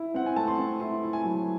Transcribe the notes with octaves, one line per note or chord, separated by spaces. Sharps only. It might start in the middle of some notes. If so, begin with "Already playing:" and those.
Already playing: E4
C4 F#5
G#5
A3 A5
C6
C4
E4 C6
E4
G#5
F#3